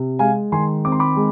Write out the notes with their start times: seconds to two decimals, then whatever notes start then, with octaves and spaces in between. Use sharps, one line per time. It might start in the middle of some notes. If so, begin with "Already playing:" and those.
Already playing: C3
0.19 G#3 F5 G#5
0.52 D#3 G#5 C6
0.85 C4 D6
0.92 C6
1.00 B5 D6
1.16 G#3